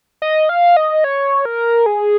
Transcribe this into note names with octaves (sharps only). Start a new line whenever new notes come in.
D#5
F5
D#5
C#5
A#4
G#4